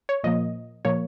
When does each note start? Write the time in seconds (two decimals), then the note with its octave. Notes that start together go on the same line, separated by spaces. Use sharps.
0.09 C#5
0.24 A#2 F3 A#3 D#5
0.85 A#2 F3 A#3 C#5